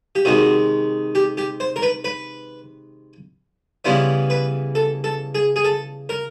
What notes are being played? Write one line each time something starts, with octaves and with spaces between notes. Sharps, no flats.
G4
C3 D#3 G#3 F#4
G4
G4
C5
A#4
B4
B4
C#3 E3 G3 B3 E4 C5
B4
A4
A4
G#4
G#4
A4
A#4